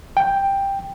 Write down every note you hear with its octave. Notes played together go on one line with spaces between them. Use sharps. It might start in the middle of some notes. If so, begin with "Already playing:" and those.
G5